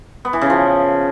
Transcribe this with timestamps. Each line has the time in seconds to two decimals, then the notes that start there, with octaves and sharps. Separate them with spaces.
0.25 B3
0.33 E3
0.41 C#3
0.50 F3